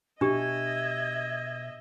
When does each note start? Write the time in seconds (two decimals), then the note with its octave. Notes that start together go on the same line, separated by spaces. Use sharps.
0.21 B2 D4 G4 D#5 E5 G#6